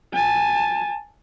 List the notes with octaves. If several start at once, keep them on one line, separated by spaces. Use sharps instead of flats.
G#5 A5